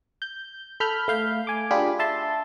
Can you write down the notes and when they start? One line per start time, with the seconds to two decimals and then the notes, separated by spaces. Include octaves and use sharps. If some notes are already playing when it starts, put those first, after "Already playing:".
0.22 G6
0.80 A4 B5 F6 G6
1.08 A3 F5 G6
1.47 G#5 D6
1.71 D4 F4 G4 G#4 B5
1.99 E5 A5 C6